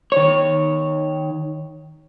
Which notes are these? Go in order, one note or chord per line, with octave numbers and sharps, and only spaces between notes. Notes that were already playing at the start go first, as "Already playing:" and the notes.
D#3 C#5